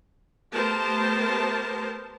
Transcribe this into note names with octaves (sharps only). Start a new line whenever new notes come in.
A3 B3 G4 A#4 C5 A5